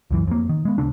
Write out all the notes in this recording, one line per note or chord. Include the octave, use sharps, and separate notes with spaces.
C#2 F#2 E3
F2 A#3
D#3
G#3 B3
D1 C#3 D4